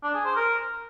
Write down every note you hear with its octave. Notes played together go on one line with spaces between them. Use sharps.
D4
G#4
C5
A#4